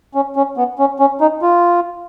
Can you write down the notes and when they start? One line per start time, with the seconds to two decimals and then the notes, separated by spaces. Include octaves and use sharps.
0.15 C#4
0.36 C#4
0.57 B3
0.79 C#4
0.99 C#4
1.21 D#4
1.42 F4